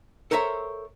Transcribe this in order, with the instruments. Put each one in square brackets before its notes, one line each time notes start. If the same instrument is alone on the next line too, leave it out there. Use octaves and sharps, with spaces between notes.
[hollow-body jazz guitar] A4 A#4 C5 C#5 E5 A#5